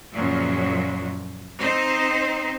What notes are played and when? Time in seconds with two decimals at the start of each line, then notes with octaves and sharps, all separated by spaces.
0.14 F#2 A#2 C#3 F3 F#3
1.61 C4 D#4 C5